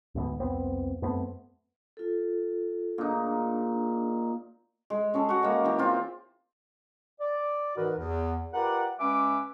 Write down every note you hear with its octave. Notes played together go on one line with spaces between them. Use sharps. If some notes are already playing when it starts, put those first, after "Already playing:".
D2 G#2 G#3 B3
C2 F2 B3 C4
F#2 A3 B3 C4
F4 A4
A#2 D4 D#4 G#4
G#3
C#4 G#4 A4
F#4 F#5
G#3 A#3
E3 G4
C4 F4
D5
G#2 E3 D#4 F#4 A#4 B4
E2
F4 G4 A#4 B4 D5 F#5
G#3 C#4 B4 E5 G#5 D6